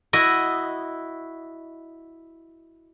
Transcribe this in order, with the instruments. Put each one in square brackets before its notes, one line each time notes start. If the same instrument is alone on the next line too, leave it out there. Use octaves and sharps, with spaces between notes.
[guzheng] E4 F#4 D#5